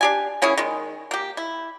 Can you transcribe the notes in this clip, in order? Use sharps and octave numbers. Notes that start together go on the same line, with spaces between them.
D4 G4 G#5
A#3 C#4 E4 G#4
D#3 G#3
A#3 G4
E4